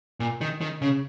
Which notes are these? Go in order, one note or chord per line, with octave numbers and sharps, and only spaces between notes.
A#2
D#3
D#3
C#3